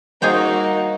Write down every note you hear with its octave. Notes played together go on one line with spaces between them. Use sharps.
G3 A#3 D#4 F#4 G#4 C5 D#5 G5